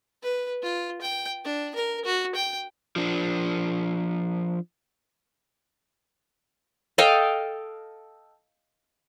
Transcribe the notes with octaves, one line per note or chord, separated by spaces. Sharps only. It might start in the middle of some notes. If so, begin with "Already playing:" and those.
B4
F4
G5
D4
A#4
F#4
G5
F3 D4
A4 D#5 F5 G5